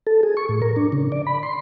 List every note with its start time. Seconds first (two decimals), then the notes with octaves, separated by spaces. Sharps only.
0.07 A4
0.23 G#4
0.37 C#6
0.49 A2
0.62 A#4
0.76 D4
0.92 C#3
1.12 D5
1.27 B5
1.43 C6